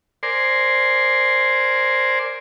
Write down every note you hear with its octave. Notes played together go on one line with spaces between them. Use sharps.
A#4 C5 D5 G#5 C6